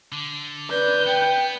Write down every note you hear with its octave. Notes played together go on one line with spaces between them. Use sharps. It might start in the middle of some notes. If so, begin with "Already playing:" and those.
D3
B4 D5 G6
B3 G5